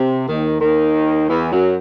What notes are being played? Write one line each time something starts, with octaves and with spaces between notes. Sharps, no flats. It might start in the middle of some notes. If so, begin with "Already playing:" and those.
Already playing: C3
D#2 D#3
D#2 D#3
E2 E3
F#2 F#3